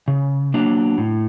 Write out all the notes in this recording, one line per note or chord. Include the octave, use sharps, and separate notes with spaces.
C#3
F#3 A#3 D4
A2